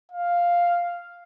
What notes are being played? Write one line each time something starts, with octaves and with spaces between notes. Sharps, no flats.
F5